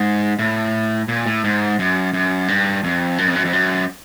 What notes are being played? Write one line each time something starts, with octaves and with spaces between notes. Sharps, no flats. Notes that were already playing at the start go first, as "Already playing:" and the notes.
Already playing: G#2
A2
A#2
A2
G#2
F#2
F#2
G2
F2
F#2
F2
F#2
F2
F#2